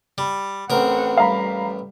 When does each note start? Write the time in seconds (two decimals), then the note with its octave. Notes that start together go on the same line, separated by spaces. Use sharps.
0.18 G3
0.70 A1 C4 A#4 F#5
1.17 G3 F5 A#5 B5